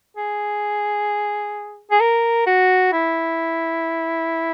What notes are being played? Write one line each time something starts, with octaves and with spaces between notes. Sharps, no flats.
G#4
G#4
A#4
F#4
E4